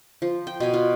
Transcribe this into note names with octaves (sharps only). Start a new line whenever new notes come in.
F3
G5
B2 G#5
F4